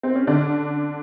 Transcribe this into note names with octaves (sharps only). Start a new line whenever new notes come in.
C4
C#4
D3 D4